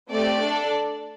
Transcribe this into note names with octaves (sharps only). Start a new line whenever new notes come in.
A3 C4 G4 D5
D4 A4